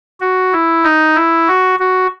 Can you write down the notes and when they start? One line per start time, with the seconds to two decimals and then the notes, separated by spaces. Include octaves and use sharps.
0.20 F#4
0.53 E4
0.84 D#4
1.15 E4
1.48 F#4
1.79 F#4